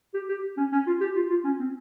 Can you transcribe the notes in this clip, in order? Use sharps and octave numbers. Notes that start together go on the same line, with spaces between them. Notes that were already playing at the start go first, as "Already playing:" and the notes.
G4
G4
C#4
C#4
F4
G4
F4
F4
C#4
C4